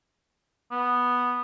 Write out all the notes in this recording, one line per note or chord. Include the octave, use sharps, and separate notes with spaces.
B3